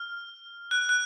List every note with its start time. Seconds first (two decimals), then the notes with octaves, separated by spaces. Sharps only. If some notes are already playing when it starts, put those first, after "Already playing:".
Already playing: F6
0.71 F#6
0.89 F#6